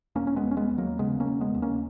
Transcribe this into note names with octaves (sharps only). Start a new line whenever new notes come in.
E1 A#3 C#4
C#4
G#3 B3
E1
C#4
G#3 B3
D#2
F#3 A#3
C#3 G#3 B3
A#3 C#4
E1
G#3 B3
D#2
A#3 C#4